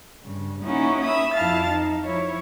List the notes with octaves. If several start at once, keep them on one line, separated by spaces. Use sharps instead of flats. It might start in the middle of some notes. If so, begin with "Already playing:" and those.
G2 C#3
A#3 C#4 D#4 E4 F#4
E5 B5 D#6
F2 F3 E4 F5 A5 A6
D#4
F3 E4 C#5